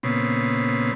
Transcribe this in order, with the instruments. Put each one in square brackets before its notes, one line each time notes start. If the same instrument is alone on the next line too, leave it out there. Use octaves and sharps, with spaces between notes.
[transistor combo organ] A#2 C#3 B3 C4